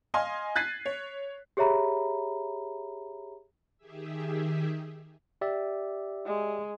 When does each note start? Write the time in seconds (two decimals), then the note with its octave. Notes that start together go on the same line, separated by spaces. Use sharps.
0.14 D#5 F5 G#5 C6
0.56 F#6 G#6 A6 B6 C7 D#7
0.86 C#5
1.57 G4 G#4 C#5 E5 A#5 B5
3.78 D#3 G4 G#4 E5
5.41 G4 D5 E5
6.26 G#3